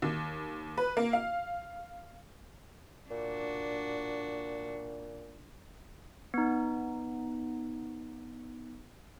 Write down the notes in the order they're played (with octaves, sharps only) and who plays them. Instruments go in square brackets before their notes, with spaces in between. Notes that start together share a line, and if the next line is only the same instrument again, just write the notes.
[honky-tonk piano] D#2
B4
A#3
F5
[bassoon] A#2 [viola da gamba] D4 F#4
[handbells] B3 D#4